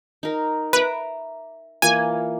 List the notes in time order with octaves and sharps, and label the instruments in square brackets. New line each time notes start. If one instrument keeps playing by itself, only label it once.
[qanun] D#4 A#4
[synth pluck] B4 [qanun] E5 A#5 D6
[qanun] E3 A#3 F4 [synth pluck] G#5